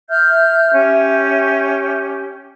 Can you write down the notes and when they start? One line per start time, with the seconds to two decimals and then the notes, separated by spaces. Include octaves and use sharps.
0.09 E5 F6 G6
0.74 C#4 G4